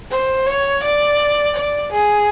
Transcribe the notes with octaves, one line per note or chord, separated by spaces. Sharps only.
C5
C#5
D5
D5
G#4